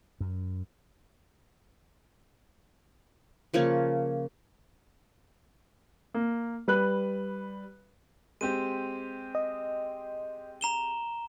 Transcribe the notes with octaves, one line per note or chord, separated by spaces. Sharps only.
F#2
C#3 F3 A#3 C#5
A#3
G3 B4 F#6
G#3 C4 G4 D#7
D#5
A#5 E7 G7